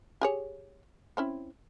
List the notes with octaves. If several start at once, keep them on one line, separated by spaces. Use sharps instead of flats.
G4 G#4 C#5
C4 C#4 E4